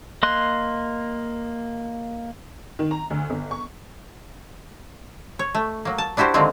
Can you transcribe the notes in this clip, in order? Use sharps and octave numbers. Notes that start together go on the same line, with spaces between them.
A#3 D#5 C6 F#6
D#3
A#5
D2
G1
C#6
C#5
A3
F#3 A#3
A5
D4 E4 F#4 G4 C5
D3 D#3 F#3 G#3 A#3 C4